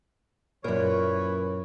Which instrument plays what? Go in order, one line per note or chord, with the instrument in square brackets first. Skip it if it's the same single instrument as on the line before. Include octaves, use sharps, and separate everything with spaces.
[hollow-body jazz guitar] F#2 A#2 [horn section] E3 B4 C#5 [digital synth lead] A#4